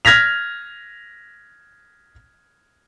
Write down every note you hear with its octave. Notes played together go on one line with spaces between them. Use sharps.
F6 G#6 A#6 B6 F7